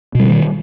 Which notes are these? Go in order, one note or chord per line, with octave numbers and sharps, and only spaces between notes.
B2 D3 D#3 G3